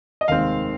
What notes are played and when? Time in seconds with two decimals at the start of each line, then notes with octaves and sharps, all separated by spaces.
0.21 D#5
0.28 F1 D#2 D#3 G#3 C4 F5